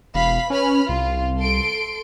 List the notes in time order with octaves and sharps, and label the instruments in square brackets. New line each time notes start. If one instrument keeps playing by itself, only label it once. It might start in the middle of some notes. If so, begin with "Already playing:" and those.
[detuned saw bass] E1 [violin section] F5 B5 B6
[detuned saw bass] C#4 [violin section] B4 B5 F6
[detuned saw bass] C2 [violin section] F4
[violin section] A4 C6 D7